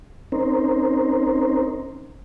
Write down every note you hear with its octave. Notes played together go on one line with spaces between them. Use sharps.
C4 C#4 D#4 A#4 C5